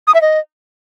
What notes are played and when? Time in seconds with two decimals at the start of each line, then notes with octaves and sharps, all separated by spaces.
0.07 D#6
0.14 E5
0.22 D#5